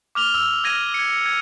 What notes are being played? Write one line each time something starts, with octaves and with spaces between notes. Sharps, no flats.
D6 F6 F7 G7
E6
F6 G#6 A#6 D#7
G#6 C#7
G#6